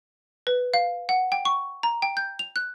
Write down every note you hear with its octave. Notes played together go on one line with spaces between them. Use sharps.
B4
F5
F#5
G5
C#6
A#5
G5
G6
F7
F#6